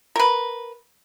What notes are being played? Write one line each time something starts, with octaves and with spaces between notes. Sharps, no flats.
A#4 B4